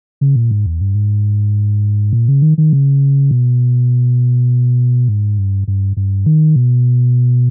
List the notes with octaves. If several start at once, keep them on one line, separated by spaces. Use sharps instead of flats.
C#3
A#2
G#2
E2
G2
G#2
A#2
C#3
D#3
D#3
C#3
B2
G#2
G2
G2
G2
D#3
B2